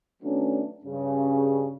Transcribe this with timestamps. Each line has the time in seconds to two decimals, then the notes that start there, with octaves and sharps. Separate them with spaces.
0.23 D#3 F#3 A3 B3 C#4 D4
0.84 G2 C#3